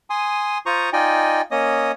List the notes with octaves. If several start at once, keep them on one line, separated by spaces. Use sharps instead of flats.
G#5 C6 D#6
F4 C5 A#5 C#6 D#6
D#4 F4 D5 D#5 G5 G#5
A#3 C#4 C#5 D#5 D#6